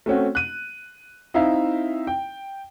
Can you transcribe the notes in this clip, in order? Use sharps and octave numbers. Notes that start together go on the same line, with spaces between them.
A3 C4 C#4 F#4
F#6 D#7
C4 D#4 E4 E5 F5
G5